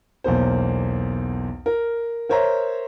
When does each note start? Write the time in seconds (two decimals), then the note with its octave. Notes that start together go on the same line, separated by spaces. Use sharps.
0.24 B1 E2 A#3 C5
1.66 A#4
2.29 A#4 C5 C#5 E5 A#5